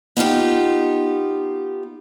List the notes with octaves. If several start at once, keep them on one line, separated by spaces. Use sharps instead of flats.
B3 D#4 F4 G4